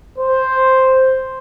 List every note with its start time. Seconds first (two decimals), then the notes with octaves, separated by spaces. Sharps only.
0.18 C5